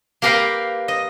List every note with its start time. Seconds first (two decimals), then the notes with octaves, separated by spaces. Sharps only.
0.22 A#3 G4 A#4 B4 F5 G5
0.88 D#5